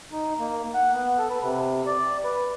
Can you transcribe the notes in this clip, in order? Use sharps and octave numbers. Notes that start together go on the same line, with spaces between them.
D#4
A#3
F#5
B3
A4
B4
C3
D5
B4